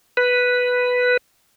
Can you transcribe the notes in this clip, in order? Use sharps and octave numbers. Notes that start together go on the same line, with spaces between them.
B4